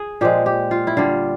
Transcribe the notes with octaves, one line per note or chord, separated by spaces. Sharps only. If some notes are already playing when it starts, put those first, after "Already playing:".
Already playing: G#4
A#2 F3 G#3 G4
G4
F4
E4
D3 G3 F4